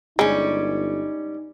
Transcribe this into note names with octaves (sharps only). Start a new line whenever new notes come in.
G1 G3 G#3 C#4 D#4